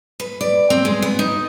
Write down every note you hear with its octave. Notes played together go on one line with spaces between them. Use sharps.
B4
D5
C4
G#3
B3
D#4